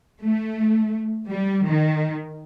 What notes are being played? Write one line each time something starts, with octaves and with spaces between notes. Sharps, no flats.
A3
G3
D#3